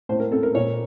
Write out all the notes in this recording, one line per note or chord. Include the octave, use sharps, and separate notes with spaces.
A2 C5
A#4
C4 A4
A#4
A#2 C#5